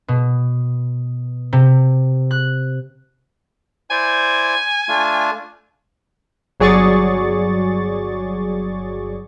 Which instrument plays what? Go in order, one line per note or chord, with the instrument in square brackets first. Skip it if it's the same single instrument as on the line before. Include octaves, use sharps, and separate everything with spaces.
[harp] B2
C3
F#6
[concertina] E4 C5 D5 [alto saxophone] G#5
[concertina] A3 D4 F4
[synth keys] G1 F#3 G#4 D5 C#6 A6